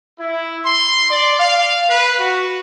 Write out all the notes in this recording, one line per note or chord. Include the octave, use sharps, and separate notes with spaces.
E4
C6
D5
F5
B4
F#4